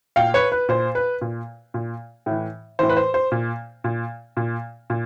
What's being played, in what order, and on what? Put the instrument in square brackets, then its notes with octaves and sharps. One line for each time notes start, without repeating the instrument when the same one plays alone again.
[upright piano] A#2 F5 G5
B4 C#5
B4
A#2 C5
B4
A#2
A#2
A2 E3
A2 E3 C5
B4
C5
C5
A#2
A#2
A#2
A#2